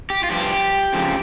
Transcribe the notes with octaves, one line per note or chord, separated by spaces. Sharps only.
G4
F4
G2 F3 G4
F2 C#3 F3